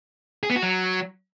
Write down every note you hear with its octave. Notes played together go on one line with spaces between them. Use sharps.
G#4
B3
F#4
F#3